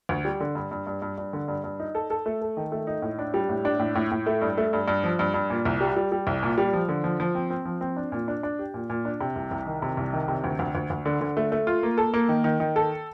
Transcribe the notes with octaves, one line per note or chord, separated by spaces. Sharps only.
D2
G3
D3
G2
G2
G2
G2
G2
D3
G2
G2
D#4
A4
A4
A3
A4
D#3
A3
D#4
A2
D4
G3
A2
D4
A2
A2
A2
A3
G2
A3
G2
G2
F3
G2
G2
A#2
C2
G3
G3
G3
C2
A#2
G3
F3
D3
F3
F3
C4
C4
F3
C4
D4
A#2
D4
D4
G4
A#2
A#2
D4
C3
C2
C2
D#3
C3
C2
D#3
C3
D2
D2
D2
D2
D3
D3
A3
A3
F4
A#3
A4
A#3
D#3
D#3
D#3
A4